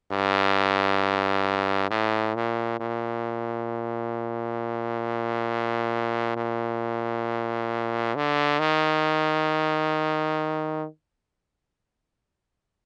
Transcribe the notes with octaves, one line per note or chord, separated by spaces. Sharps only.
G2
A2
A#2
A#2
A#2
D3
D#3